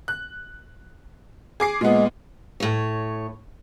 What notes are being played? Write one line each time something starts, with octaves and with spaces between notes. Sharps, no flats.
F#6
G#4 D6 C7
A#2 G#3 B3
A2 C#5